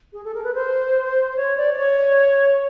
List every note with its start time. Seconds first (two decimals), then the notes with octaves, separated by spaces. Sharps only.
0.13 G#4
0.24 A4
0.35 A#4
0.44 B4
0.54 C5
1.37 C#5
1.57 D5
1.74 D5
1.78 C#5